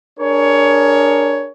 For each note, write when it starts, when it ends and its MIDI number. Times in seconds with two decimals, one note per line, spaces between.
0.19 1.50 62
0.19 1.50 68
0.19 1.50 70
0.19 1.50 73